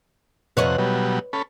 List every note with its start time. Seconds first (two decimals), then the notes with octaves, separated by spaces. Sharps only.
0.57 F2 C3 B4 C#5 D#5 F#5
0.78 B2 F#3 G3
1.33 C#4 A4 B5